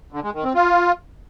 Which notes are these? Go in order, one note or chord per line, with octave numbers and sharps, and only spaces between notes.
D3
G#3
D#3
C4
F4